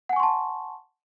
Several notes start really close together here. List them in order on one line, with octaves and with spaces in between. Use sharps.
F#5 G#5 C#6 C6 A5